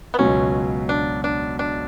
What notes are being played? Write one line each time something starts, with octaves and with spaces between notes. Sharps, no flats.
B3
C#2 B2 F#3 C#4
D4
D4
D4